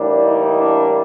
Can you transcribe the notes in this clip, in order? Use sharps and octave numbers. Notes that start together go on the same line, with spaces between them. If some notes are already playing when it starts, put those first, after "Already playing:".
Already playing: A2 E3 G3 A#3 D4
D#4
D4